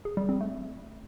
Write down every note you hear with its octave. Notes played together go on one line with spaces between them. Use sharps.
G#4
G3
C4
A3